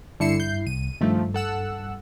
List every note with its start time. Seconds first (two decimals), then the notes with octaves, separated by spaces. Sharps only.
0.20 G2 D3 E4 C7 C#7 E7
0.40 G6
0.67 C2 D#7
1.01 G2 D#3 F3 A3
1.34 A4 F#5 E6